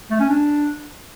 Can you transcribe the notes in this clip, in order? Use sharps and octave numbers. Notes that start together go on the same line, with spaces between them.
A3
C#4
D4